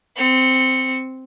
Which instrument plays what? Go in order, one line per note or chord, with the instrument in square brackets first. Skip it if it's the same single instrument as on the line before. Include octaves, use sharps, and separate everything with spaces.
[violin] C4 C#7